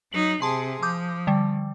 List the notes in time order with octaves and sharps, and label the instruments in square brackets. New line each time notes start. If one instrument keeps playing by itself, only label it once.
[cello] F#3 D#4 [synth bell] F#7
[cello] C3 G#4 [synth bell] A5 C6
[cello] F3 [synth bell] D6 D#6 G6
[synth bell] D3 G3